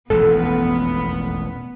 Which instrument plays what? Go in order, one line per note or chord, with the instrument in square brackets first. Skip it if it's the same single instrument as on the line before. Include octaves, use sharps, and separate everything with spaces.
[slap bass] E1 A1 F2 [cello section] B3 [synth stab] A4